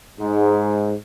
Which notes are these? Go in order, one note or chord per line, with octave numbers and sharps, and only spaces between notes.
G#2